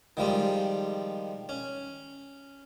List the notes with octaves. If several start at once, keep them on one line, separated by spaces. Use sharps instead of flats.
D#3 F3 G3 G#3
C#4